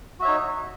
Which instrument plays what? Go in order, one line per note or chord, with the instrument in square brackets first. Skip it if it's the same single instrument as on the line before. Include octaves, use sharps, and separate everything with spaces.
[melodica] F#4
E5
C#5
D#4